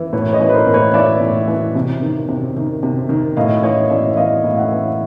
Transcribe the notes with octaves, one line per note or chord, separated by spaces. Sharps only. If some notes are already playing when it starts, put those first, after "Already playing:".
Already playing: E3
A2 B4 C#5
C#5 D#5
E3
B4
A#4 C5
A2
B4 C#5
E3 D5 E5
A2
E3
C3
D#3
C3
D#3
C3
D#3
A2 D#5 F5
E3 C#5 D#5
A2 D5 E5
E5
E3 D#5 F5
A2
E5 F#5
E3